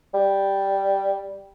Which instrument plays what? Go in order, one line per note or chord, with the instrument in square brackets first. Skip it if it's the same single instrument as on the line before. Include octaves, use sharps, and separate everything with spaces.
[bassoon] G3